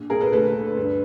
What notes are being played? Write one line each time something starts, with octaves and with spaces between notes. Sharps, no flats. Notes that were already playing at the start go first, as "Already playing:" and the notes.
Already playing: A#1
A#2 G#4 A#4
A4 B4
D2 A4 B4
D3
G2